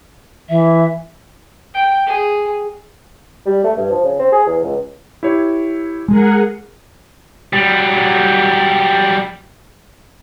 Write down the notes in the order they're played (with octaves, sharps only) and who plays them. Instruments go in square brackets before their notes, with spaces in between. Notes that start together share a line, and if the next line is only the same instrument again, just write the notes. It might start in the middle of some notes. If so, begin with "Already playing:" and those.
[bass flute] E3 [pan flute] E5
[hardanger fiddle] G5
G#4
[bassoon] G3
A3
G2
F3
C#3
C4
G#4
E2
C#2
[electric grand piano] E4 G4 C#5
[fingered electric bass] G#3 [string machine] G#4 A#4 F#5
[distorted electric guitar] F#3 G3